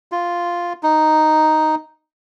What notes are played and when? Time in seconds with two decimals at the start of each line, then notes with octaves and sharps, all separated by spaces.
0.12 F4
0.83 D#4